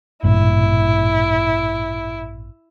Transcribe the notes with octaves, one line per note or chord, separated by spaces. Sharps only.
A1 G2 A#2 E4